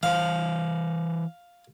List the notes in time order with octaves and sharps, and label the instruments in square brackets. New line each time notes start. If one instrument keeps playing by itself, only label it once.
[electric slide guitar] E3 C5 [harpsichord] F5